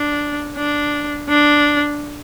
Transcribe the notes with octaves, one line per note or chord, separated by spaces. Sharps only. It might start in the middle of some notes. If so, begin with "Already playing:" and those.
Already playing: D4
D4
D4